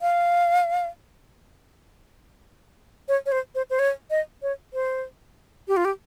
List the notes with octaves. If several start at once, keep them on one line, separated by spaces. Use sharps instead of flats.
F5
C#5
C#5
C5
C5
C5
C#5
D#5
C#5
C5
G4
F4
G4